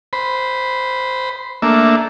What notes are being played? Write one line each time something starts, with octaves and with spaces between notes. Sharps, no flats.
C5 B5
A3 A#3 D4 E5